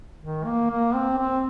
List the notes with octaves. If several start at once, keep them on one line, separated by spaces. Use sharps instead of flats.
D#3
A#3
A#3
C4
C4